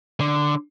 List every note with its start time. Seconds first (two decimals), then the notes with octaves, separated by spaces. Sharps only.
0.20 D3